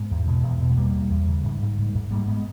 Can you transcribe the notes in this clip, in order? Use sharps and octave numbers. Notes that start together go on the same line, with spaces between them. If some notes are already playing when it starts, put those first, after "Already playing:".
Already playing: G#2 G#3 B3
E2
B2
E2
B2
G#3
E2 G3 A#3
E2
E2
C#3
G#2
G#2
G#2
G#2
G#2 G3 A#3
G#3 B3